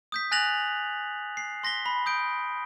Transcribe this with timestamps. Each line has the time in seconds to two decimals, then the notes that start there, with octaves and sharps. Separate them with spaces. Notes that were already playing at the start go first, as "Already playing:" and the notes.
0.12 D#6 G6 B6
0.31 G#5 F#6 A6 A#6 F7 F#7
1.37 C7
1.64 C6 A#6 B6 G7
1.86 B5
2.06 D#6 G6 D7